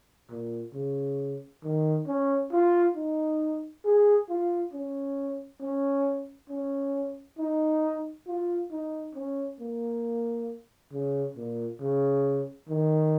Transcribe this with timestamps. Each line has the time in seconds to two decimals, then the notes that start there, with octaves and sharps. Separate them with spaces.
0.31 A#2
0.74 C#3
1.64 D#3
2.07 C#4
2.52 F4
2.95 D#4
3.85 G#4
4.29 F4
4.73 C#4
5.61 C#4
6.50 C#4
7.39 D#4
8.27 F4
8.71 D#4
9.15 C#4
9.60 A#3
10.92 C#3
11.37 A#2
11.81 C#3
12.69 D#3